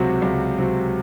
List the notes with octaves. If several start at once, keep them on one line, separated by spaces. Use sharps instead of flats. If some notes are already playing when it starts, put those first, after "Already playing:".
Already playing: C#2 C3 F#3 C4 F#4
C#2
C3 F#3 C4 F#4